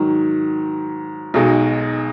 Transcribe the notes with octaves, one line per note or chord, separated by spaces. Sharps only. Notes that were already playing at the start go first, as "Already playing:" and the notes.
Already playing: G#2 D#3 F#3
B1 B2 G#3 D#4